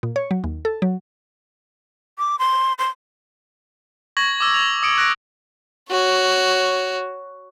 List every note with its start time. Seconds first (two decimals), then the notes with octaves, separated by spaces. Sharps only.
0.03 A#2
0.16 C#5
0.31 F#3
0.44 D#2
0.65 A4
0.82 F#3
2.18 D6
2.39 C6
2.79 C6
4.17 C#6 G#6 A#6 F#7
4.40 D6 E6
4.54 F7
4.83 D#6 C#7 D7
4.98 F#6 A#6 D7
5.89 F#4 C#5